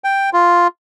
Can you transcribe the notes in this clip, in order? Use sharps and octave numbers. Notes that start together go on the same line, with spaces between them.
G5
F4